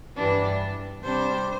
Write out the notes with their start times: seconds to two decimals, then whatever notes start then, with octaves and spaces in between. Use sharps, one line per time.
0.15 G2 E3 G3 D4 B4
1.02 C3 G3 D4 C5